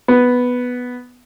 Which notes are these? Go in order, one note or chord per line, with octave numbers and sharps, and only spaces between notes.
B3